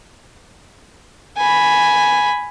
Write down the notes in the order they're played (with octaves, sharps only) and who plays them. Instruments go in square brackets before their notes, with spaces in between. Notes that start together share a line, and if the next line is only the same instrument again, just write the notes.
[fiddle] G#5 B5